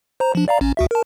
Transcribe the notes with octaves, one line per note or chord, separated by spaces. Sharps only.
C5 A#5
F3 D4
D5 F5 A#5
A1 C#4
D2 F#4 E5
A#4 A5